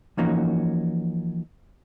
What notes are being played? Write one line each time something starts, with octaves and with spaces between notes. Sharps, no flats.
E3 F3 A#3 C#4 D#4 F#4